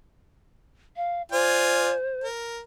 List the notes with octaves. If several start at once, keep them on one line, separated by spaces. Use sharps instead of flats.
F5
F4 C5 D5 G#5
A#4